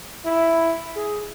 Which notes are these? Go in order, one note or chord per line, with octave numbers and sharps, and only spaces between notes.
E4
G#4